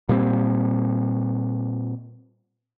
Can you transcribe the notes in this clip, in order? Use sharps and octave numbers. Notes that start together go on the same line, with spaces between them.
A#2 G3 B3 C4